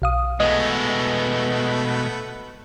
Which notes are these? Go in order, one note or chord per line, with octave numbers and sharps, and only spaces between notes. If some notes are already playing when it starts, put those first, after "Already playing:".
B1 F5 D#6
B2 G#3 A3 B3 B4 D#5